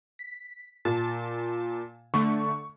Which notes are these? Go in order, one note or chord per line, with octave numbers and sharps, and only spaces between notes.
B6
A#2 A5
D3 A3 C#6